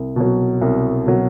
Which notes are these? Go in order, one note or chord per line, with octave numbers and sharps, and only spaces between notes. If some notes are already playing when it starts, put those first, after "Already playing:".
Already playing: C2
B2 F#3
C2
B2 F#3